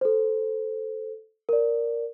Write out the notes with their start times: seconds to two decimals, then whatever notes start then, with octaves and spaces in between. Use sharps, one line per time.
0.01 A4 C5
1.49 A#4 D5